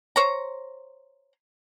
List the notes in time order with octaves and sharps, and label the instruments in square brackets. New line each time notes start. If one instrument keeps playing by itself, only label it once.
[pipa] C5 C#5 A#5